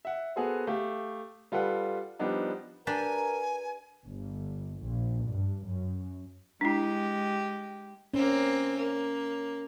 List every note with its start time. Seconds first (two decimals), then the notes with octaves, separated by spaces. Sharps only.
0.05 E5 F#5
0.36 B3 F#4 G#4 A4 C5
0.67 A3 G4 F5
1.52 G3 F4 A4 B4 F#5
2.19 F3 G3 B3 D4 D#4
2.87 D4 G4 A#4 B4 G#5
4.06 G1
4.78 A#1
5.28 G2
5.70 F#2
6.61 G#3 D4 E4 G4
8.14 A#3 C4 C#4
8.77 A#3